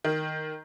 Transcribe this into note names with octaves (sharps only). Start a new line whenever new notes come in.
D#3